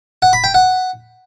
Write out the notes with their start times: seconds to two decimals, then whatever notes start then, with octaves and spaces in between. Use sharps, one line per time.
0.22 F#5
0.33 B5
0.44 G5
0.54 F#5